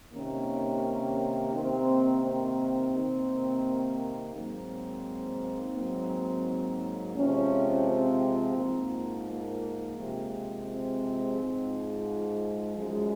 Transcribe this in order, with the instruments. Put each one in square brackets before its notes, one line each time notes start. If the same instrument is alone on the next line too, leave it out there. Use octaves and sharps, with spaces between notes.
[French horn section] C3 D#3 A#3 C#4
C3 D#3 A#3 C4
C4
C3 D#3 A#3
G#2 F#3 A#3 C4
G#2 F#3 A#3
C3 F3 G#3 C#4
C4
G#2 F3 A#3
A#3
C3 F3 G#3
C4
G#2 F3 G#3
F#2 F3 G#3